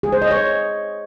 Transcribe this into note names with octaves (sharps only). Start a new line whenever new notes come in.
G#4
C5
D#5
C#5